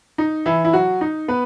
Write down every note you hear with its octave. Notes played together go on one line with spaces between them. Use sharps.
D#4
E3 E4
E4
F#3 F#4
D#4
B3 B4